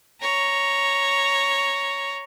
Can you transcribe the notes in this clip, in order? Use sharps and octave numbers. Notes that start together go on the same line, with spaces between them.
C#5 A#5